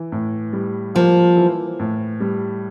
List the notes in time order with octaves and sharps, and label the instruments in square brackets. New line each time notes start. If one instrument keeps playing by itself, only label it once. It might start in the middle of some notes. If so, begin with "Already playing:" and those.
Already playing: [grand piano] E3
A2
G3
[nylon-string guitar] F3 [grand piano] A#3
[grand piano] E3
A2
G3